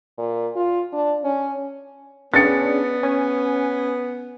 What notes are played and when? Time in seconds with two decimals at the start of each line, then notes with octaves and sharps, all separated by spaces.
0.18 A#2
0.56 F4
0.93 D4
1.24 C#4
2.34 B3 C#4 D4 G#4 A6 C#7
3.03 C#4 G#5